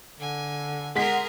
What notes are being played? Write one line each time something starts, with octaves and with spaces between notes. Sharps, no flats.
D3 G#5
G#3 G#4 A#4 F#5 B6